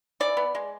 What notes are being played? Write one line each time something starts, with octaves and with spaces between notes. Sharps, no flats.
E3 D5
B3
G#3